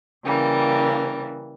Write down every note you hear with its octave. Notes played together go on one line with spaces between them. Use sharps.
C#3 E3 G3 A#3